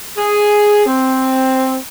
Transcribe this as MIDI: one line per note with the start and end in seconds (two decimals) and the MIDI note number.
0.18 0.83 68
0.86 1.77 60